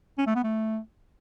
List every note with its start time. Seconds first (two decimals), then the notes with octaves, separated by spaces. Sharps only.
0.18 C#4
0.27 A3
0.35 B3
0.43 A3